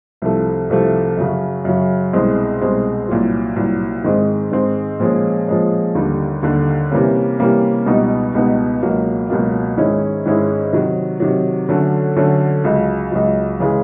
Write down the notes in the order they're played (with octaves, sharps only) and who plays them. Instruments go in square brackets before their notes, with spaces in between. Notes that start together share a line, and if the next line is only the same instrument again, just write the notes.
[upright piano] C2 C3 F3 A3
C2 C3 F3 A3
F#2 C#3 F#3
F#2 C#3 F#3
C2 B2 G#3 C4
C2 B2 G#3 C4
C2 A#2 F#3
C2 A#2 F#3
G#2 D#3 G#3 C4
G#2 D#3 G#3 C4
A#2 F3 G#3 C#4
A#2 F3 G#3 C#4
D#2 D3 G3
D#2 D3 G3
C3 E3 G3 A#3 C#4
C3 E3 G3 A#3 C#4
C#2 B2 G3 B3 D#4
C#2 B2 G3 B3 D#4
C#2 B2 F#3 A#3
C#2 B2 F#3 A#3
G#2 D#3 G#3 C#4 E4
G#2 D#3 G#3 C#4 E4
C3 D#3 F#3
C3 D#3 F#3
D3 F#3 A3 C#4
D3 F#3 A3 C#4
C#2 C#3 F#3
C#2 C#3 F#3
C#3 E3 G#3